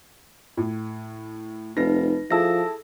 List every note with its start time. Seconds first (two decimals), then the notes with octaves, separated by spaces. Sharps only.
0.57 A2
1.77 F1 D#4 B4 A#6
2.31 F3 E4 G#4 A4 A5 E6 A#6